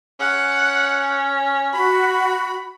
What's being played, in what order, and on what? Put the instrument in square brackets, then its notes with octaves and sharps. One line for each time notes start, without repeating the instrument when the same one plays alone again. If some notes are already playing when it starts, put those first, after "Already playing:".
[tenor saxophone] C#4 [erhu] F#5
[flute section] F#4 [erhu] B5